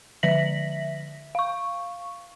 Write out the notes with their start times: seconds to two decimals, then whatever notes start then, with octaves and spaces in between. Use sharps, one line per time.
0.23 D3 F3 E5 A#6 B6 F#7
1.35 F5 C#6